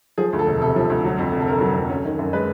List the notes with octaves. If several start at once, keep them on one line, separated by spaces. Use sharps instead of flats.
F3 G#4
D2
A4
E1
C3 A4
F3
D2
F#3
F2
F1
A4
D3 A#4
F#3
F2
C#4
D#3
F#2
G#3 B4